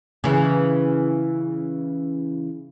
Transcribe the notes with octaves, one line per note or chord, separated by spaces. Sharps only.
C#3 E3